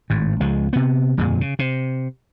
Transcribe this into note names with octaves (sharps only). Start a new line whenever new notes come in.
G#1 A2
C#2 F3 G#3
C3 B3
G1 F2 A#2 G#3
C#3
C3